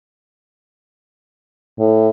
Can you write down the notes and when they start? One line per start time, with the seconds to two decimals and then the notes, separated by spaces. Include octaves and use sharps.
1.79 A2